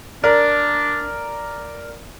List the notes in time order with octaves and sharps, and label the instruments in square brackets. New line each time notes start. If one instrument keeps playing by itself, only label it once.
[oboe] D4 [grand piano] A#4 D5